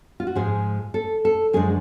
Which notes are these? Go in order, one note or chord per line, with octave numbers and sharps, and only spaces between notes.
F4
F#4
G#2 F3 G#3 G#4
A4
A4
F#2 D3 F3 G#3 G#4